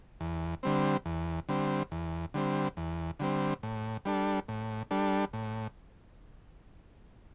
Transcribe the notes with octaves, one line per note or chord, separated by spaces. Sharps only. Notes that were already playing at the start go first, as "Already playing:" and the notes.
E2
D3 G3 C4
E2
D3 G3 C4
E2
D3 G3 C4
E2
D3 G3 C4
A2
G3 D4 A4
A2
G3 D4 A4
A2